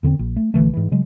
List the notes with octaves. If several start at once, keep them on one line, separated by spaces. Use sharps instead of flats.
E2 D3 A#3 C4
A#1
A3
A#1 D3 E3 A3
G#2 E3
C#3 F#3 G#3